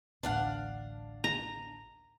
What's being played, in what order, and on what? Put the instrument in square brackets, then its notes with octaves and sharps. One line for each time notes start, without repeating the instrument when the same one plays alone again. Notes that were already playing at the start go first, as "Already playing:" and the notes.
[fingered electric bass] A1 D2 [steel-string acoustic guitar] D4 F5 F#5
[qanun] A#5